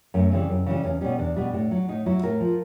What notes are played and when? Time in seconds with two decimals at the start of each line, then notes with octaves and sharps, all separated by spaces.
0.14 F#2 A3
0.31 C#3 E3 G3 C4
0.49 F#2
0.66 C#3 E3 G3
0.84 E2 C#4
1.01 B2 G3 C#4
1.18 E2 D4
1.36 B2 G3
1.53 A2
1.71 F#3
1.88 A2 D#4
2.06 F#3 E4
2.23 A2 A#4
2.40 F3